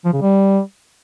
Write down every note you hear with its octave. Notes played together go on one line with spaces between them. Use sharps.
F3
C#3
G3